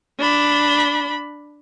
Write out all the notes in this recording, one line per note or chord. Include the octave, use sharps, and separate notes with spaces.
D4 B5